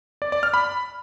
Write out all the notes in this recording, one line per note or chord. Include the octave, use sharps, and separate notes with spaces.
D5
D5
F6
B5